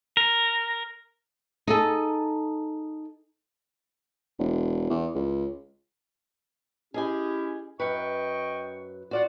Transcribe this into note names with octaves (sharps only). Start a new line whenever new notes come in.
A#4
D#4 G#4 A4
E1
E2
C#2
C#4 E4 G4 G#4 D#5 G#5
F#2 B4 D#5 G5 C#6
F4 F#4 D5 F#5